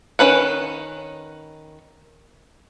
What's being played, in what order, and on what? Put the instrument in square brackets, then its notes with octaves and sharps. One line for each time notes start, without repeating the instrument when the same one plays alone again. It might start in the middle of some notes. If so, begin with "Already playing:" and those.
[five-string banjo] D#3 C#4 B4 F#5